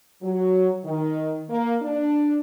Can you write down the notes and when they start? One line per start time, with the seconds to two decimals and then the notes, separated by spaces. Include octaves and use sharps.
0.22 F#3
0.84 D#3
1.49 A#3
1.82 D4